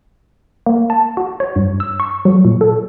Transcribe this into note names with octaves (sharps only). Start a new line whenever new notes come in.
A#3
A5
F#4
C#5
G2
E6
C#6
F#3
A#2
A4